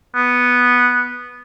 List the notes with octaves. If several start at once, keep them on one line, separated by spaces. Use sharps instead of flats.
B3